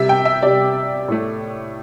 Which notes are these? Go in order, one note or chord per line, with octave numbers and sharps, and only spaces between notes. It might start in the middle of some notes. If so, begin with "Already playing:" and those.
Already playing: C3 G3 E5
G5
E5
C3 G3 D5
A2 A3